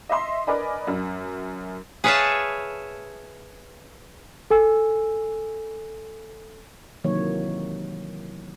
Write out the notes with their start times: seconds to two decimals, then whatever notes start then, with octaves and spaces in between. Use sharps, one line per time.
0.09 D#5 E5 C6
0.47 A#4 B4 D5 D#5 G#5 B5
0.87 F#2
2.04 G#4 B4 C#5 E5 F5 A5
4.50 A4 G#5 E6
7.04 C3 D#3 E3 F#3 A#3 C#5